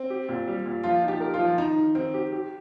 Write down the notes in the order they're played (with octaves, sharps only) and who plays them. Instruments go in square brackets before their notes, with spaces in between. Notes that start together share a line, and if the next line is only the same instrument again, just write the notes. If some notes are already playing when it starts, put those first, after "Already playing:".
Already playing: [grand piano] C4
[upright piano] G4
A#2
G3
A#2
[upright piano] F3 [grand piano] F4
[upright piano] D#4
[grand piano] G4
[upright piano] A#4
[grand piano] F4
[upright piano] F3
[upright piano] D#3 [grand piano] D#4
[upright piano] D#3
[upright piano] D#3 [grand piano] C4
[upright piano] G4
G4